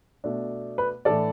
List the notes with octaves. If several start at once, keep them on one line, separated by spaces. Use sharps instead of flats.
B2 A3 D4
B4
A2 E3 D4 A4 D5